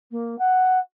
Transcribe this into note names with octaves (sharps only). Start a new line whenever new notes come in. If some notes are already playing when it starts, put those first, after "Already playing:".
A#3
F#5